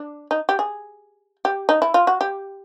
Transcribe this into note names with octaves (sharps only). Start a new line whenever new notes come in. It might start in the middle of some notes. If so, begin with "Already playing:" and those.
Already playing: D4
D#4
G4
G#4
G4
D#4
E4
F4
F#4
G4